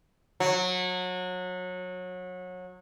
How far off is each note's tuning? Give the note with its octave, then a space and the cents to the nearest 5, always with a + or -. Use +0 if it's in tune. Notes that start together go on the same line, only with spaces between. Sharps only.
F#3 -25